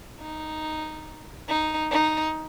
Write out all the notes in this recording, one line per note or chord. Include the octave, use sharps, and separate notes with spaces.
D#4
D#4
D#4